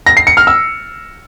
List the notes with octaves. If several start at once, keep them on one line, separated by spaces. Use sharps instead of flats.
A#6
C7
C#7
F6
E6